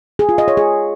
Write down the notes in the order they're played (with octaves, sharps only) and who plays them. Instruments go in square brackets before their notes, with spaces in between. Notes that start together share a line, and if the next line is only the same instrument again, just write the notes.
[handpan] G#4
F4
D#5
C#5
G#4